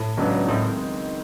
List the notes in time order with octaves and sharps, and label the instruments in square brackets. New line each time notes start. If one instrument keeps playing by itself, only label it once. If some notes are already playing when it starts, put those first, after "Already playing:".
Already playing: [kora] A2
[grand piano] C#2 C#3 F#3 B3 D4
[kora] A2 [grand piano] D#3 G#3 C4 D#4